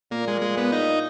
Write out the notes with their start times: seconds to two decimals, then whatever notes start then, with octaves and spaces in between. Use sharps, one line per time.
0.11 A#2 A#3
0.28 G#3
0.42 G#3
0.58 B3
0.72 D#4